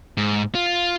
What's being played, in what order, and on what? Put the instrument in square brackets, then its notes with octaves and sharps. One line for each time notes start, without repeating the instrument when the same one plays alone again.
[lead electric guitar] G#2
F4